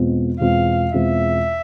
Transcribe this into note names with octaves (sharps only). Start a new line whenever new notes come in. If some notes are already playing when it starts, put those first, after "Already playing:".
Already playing: E2 B2 G#3 C4 F4
E2 B2 G#3 C4 F4 F5
E2 B2 G#3 C4 F4 E5